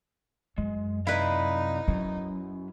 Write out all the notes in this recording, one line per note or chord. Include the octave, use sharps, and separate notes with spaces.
F#2 G#3
C3 D#4 E4 B4 D5 F5
F#2 F#3 C#4